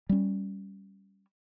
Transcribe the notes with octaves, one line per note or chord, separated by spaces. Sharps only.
G3 C#4